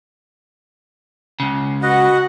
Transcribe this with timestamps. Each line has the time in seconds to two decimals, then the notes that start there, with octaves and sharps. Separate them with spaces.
1.40 C#2 C#3
1.83 F#4 B4 D#5 F#5